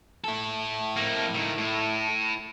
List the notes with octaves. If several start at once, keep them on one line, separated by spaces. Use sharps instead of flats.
E4 A4
F2 A#3
C#2 D#3
A2